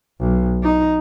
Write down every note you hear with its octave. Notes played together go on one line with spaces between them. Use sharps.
B1
D#4